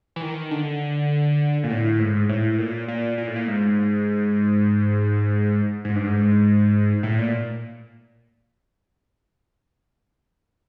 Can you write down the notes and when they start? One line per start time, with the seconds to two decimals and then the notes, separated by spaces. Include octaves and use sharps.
0.16 E3
0.22 D#3
0.51 D3
1.64 A#2
1.70 A2
1.99 G#2
2.29 A2
2.58 A#2
2.88 A#2
3.18 A#2
3.27 A2
3.36 A#2
3.48 G#2
5.85 G#2
5.96 G2
6.07 G#2
7.03 A2
7.19 A#2